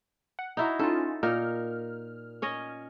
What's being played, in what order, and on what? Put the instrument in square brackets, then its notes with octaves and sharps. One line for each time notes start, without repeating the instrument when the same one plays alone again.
[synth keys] F#5
[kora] D#4 E4 F#4 [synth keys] A#5
[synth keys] C#4 D#4 F4 [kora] A4
[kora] A#2 D#4 A#4 [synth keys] F6
[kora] C#4 C#5 D#5